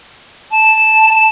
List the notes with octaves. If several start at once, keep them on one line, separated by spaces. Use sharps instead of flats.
A5